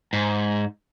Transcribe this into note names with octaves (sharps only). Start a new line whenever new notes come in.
G#2